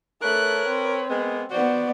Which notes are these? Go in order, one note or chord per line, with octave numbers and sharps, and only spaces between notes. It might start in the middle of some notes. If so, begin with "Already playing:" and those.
A3 A#4 B4 C#5 F#6
C4
G#3 A#3 B3
B3 F#4 C5 D5